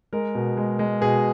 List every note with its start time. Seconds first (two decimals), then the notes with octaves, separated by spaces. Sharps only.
0.13 G#3 A#4
0.35 B2
0.57 G#3
0.79 G#3
1.01 B2 G#4